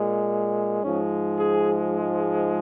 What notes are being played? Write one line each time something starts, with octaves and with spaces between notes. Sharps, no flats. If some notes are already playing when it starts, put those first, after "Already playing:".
Already playing: A#2 G#3
G#2 F3 G#3 C#4
G#4